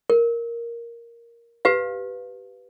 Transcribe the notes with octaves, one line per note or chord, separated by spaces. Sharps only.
A#4
G4 B4 F5